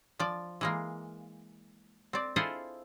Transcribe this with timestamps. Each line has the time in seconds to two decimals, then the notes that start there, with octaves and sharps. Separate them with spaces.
0.19 F3 D5
0.61 E3 G#3 A#3
2.13 C4 D5
2.36 E4 F4 G#4 A4 C5 D#5